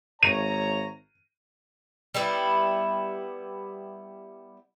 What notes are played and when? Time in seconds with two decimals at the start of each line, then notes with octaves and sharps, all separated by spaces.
0.23 G#1 C#5 A#5 D#7
2.14 G3 B3 E4